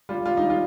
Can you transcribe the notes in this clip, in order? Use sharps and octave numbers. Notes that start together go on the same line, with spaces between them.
G3 F4
G3 F4
D#4
G3
F4